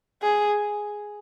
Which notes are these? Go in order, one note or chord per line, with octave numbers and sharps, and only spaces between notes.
G#4